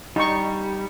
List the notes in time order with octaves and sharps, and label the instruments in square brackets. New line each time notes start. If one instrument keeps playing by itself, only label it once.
[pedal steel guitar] G3 [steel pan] D#4 C#6